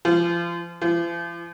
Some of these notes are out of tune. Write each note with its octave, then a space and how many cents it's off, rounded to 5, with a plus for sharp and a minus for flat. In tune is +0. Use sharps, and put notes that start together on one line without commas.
F3 -35
F3 -45